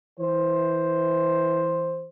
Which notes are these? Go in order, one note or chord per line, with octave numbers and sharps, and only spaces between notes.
E3 C5